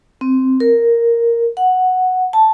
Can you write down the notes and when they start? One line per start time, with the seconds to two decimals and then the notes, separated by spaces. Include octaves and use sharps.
0.21 C4
0.60 A#4
1.57 F#5
2.33 A5